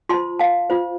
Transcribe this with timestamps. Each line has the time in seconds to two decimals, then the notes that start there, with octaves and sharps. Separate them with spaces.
0.09 F4 C5 A5 C6
0.40 F5 A5
0.70 F4 C5